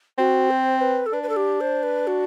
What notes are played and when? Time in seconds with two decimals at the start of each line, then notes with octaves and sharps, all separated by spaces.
0.18 C4 F#4
0.50 C5
0.81 B4
1.06 A4
1.13 D4 B4
1.23 B4
1.29 A4
1.36 G4
1.61 C5
1.83 B4
2.07 F#4